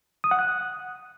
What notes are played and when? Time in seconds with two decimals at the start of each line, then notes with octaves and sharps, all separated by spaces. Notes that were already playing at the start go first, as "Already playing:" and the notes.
0.24 D#6
0.31 F#5
0.39 F#6